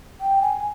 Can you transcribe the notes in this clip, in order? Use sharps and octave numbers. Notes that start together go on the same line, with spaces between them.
G5
G#5